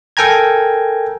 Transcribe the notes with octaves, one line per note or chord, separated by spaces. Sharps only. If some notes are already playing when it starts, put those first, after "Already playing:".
A4 A#4 G5 G#5 A#5 G#6